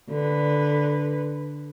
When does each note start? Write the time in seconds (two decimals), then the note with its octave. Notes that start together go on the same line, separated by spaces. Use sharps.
0.10 D3 B4